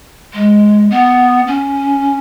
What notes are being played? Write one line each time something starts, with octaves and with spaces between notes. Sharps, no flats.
G#3
B3
C#4